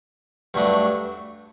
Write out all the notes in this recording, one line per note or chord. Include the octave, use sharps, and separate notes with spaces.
G2 F#3 A3 D4